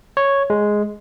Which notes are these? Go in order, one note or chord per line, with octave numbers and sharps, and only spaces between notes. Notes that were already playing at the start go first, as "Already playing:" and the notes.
C#5
G#3